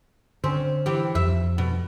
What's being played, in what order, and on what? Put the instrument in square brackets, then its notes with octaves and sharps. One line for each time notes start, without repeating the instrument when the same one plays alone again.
[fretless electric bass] D3 [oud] C4 C#4
[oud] E3 G4
[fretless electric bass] F2 [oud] E5
[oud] B2